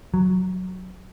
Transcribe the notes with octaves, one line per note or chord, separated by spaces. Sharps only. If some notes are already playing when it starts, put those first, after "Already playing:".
F#3